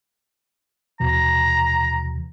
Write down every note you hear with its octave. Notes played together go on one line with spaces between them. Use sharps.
D#2 B2 E3 A#5